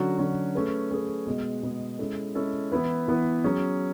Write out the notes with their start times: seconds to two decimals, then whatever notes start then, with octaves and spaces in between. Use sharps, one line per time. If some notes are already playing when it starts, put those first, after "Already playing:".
Already playing: D3 F#3 C#4 F#4
0.18 D3 F#3 C#4 F#4
0.55 A3 C#4 G#4 B4
0.91 A3 C#4 G#4 B4
1.26 B2 G#3 B3
1.63 B2 G#3 B3
1.99 G#3 C#4 E4 A4
2.35 G#3 C#4 E4 A4
2.72 E3 B3 E4 B4
3.08 E3 B3 E4 B4
3.44 F#3 C#4 G#4